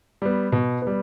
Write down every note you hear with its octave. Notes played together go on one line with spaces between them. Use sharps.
G3 B3
B2
G3 B3